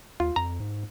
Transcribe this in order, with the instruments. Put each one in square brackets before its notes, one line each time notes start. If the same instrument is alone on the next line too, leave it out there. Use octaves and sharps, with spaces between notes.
[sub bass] D#2 [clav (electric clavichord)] F4
[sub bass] F2 [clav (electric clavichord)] A#5
[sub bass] G#2